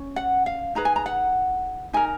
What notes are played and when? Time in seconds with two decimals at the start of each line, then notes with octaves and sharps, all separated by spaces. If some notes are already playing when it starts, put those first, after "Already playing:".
Already playing: C#4
0.16 F#5
0.46 F5
0.75 D#4 G#4 B4 A#5
0.85 G#5
0.96 A#5
1.06 F#5
1.93 D#4 A#4 G#5